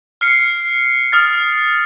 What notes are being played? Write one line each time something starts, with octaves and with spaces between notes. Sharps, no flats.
F6 C7 C#7
D#6 F6 A6